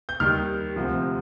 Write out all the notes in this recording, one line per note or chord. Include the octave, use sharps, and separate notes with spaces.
G6
D#2 D#3 G3 F6
D2 C3 F3